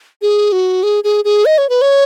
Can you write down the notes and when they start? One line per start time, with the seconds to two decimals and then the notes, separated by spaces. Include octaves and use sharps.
0.22 G#4
0.52 F#4
0.83 G#4
1.04 G#4
1.25 G#4
1.45 D#5
1.58 C#5
1.69 B4
1.82 C#5